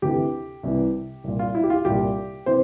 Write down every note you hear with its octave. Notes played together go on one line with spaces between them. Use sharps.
D2 C3 E3 G4
C2 C3 E3
C2 A#2
F4
E4
G4
F4
C2 A#2 G4
C3 E3 C5